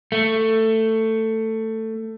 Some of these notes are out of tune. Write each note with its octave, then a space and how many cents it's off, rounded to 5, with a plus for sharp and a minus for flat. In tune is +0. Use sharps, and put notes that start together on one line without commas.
A3 +15